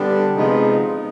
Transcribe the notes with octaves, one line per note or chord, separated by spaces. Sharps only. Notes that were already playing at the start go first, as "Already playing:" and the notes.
Already playing: D3 G3 B3 D4
C3 F3 G#3 B3 D#4